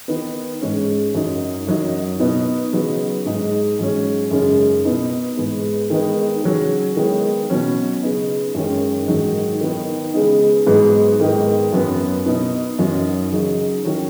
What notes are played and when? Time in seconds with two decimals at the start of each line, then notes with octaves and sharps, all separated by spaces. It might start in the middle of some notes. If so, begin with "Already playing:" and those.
0.08 D#3 B3 D#4
0.61 G#2 G#3 C#4
1.14 F#2 F#3 D#4
1.67 F#2 F#3 D#4
2.20 B2 B3 D#4
2.73 C#3 F#3 B3 D#4
3.25 G#2 G#3 D#4
3.79 G#2 F#3 C#4
4.31 F#2 C#3 G#3 D#4
4.85 B2 B3 D#4
5.37 G#2 G#3 B3
5.90 D#3 G#3 B3 D#4
6.43 C#3 F#3 C#4
6.96 D#3 G#3 B3 D#4
7.50 B2 F#3 C#4
8.02 C#3 B3 D#4
8.54 F#2 D#3 G#3 C#4
9.08 G#2 D#3 F#3 D#4
9.61 D#3 B3 D#4
10.14 C#3 G#3 B3 D#4
10.66 G#2 F#3 B3 D#4
11.20 G#2 D#3 B3 D#4
11.72 F#2 F#3 B3
12.26 B2 B3 D#4
12.78 F#2 F#3 D#4
13.32 C#3 F#3 D#4
13.84 D#3 F#3 C#4